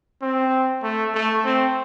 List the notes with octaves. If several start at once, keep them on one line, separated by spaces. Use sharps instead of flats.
C4
A3
A3
C4